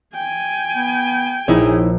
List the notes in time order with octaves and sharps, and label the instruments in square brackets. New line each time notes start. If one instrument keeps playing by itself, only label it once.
[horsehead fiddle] G5 G#5
[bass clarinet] B3
[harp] A#1 [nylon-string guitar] D#4 E4 C#5 [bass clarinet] G#4